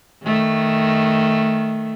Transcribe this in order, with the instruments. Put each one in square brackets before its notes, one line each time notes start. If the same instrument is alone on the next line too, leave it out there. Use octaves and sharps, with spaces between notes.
[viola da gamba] D#3 A3